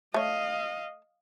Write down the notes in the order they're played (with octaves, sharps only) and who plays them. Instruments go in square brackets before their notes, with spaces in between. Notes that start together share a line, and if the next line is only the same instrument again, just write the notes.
[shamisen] A3 C#5 [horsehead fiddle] D#5 F5